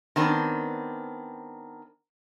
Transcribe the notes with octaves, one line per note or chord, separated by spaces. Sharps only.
D#3 B3 C4 D4